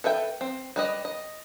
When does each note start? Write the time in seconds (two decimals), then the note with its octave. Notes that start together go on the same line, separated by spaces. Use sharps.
0.04 A4 B4 E5 G5
0.41 C4
0.76 G3 B4 D#5
1.05 D#5